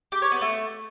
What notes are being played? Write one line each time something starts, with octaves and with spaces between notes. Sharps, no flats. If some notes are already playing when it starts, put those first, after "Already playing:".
G4
C#5
B3
A3